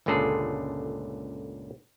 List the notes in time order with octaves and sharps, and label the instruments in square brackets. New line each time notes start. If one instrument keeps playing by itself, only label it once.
[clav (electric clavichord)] G1 C#2 A#2 D3 G#4 A4